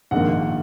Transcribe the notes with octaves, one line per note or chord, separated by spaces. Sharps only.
A#1 G#2 D#3 A#3 F#5